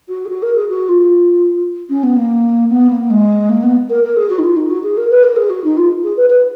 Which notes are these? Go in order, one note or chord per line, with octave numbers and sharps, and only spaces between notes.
F#4
G#4
F#4
A#4
G#4
F#4
F4
C#4
B3
A#3
B3
A#3
G#3
A#3
B3
A#4
A#4
G#4
F#4
D#4
F4
D#4
F#4
G#4
A#4
B4
A#4
G#4
F#4
D#4
F4
G#4
B4
B4